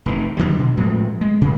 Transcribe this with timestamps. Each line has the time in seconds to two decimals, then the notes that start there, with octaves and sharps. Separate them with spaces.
0.06 F1 D#3 E3
0.37 D3 D#3 F#3 G3
0.58 B2
0.77 A2 F3 G#3 A3
1.21 G#3
1.41 C3 G#3